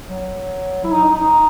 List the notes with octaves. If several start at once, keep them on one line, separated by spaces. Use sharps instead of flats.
F#3
E4
D#4
D#4
D#4